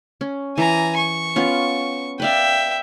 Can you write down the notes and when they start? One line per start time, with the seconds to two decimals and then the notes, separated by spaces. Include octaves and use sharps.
0.21 C#4
0.58 E3 G#5 A#5
0.97 C#6
1.36 B3 C#4 F4
2.20 B4 D5 E5 F5 G5